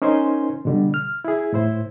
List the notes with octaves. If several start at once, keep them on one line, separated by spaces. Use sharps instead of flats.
C#4 D#4 A#4 C5 G#5 C6
B2 D3 G3
F6
E4 G#4
A2 E4 C5